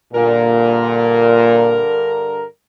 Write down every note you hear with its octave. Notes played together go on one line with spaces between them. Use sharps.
G2 A#2 D3 A#4